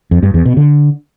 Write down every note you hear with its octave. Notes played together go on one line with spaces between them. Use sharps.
F2
G2
E2
B2
D3